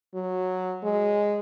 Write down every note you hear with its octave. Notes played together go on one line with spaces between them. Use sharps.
F#3
G#3